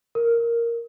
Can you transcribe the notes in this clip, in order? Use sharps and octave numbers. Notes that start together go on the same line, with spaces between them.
A#4